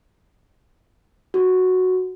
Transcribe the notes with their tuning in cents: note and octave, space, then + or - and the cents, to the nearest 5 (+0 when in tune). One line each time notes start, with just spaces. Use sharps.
F#4 -5